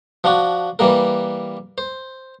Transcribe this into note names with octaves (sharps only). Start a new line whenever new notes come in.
F3 D4 F4 F#4
E3 G3 A#3 A#4
C5